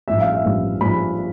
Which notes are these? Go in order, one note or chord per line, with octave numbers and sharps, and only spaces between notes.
A1 G2 F3 E5
F5
E5
A1 G2 F3
A1 G2 F3 B5